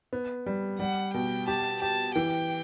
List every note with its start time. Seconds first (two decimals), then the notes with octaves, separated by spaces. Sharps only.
0.13 B3
0.46 G3
0.79 G3 F#5
1.14 B2 G5
1.48 G4 A5
1.82 G4 A5
2.15 E3 G5